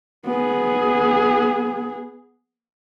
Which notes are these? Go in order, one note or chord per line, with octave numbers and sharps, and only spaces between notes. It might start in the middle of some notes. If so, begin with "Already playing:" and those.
B3 G#4